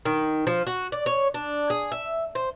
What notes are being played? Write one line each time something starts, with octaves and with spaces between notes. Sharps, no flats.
D#3
F3
F#4
D5
C#5
D4
G#4
E5
C5